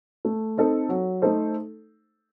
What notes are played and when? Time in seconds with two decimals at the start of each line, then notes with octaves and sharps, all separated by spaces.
0.25 A3
0.57 C4 D#4 A4
0.89 F#3
1.22 A3 D#4 A4 C5